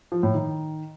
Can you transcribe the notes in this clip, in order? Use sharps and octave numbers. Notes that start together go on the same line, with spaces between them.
F3
A2
D#3